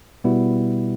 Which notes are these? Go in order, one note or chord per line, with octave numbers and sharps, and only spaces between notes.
B2 G3 B3 E4